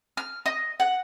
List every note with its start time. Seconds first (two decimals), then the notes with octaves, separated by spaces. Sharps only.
0.17 F6
0.46 D#5
0.80 F#5